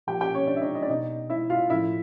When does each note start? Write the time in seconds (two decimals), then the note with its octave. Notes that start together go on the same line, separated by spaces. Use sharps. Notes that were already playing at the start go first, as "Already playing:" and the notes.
0.07 A#2 F3 G4 G5
0.21 G4 G5
0.35 C#4 C#5
0.47 D4 D5
0.56 E5
0.61 D#4 D#5
0.75 D#5
0.83 D5
0.89 B2 D#4 D#5
1.30 E4 E5
1.50 F4 F5
1.70 A2 F3 E4 E5